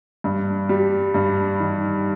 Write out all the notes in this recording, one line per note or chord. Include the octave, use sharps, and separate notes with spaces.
G2
G3
G2
D#3